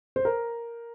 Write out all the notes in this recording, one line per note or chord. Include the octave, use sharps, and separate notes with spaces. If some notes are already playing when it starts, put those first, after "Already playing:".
C5
A#4